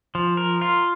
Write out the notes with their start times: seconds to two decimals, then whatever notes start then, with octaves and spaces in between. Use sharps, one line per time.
0.15 F3
0.37 A#4
0.62 F4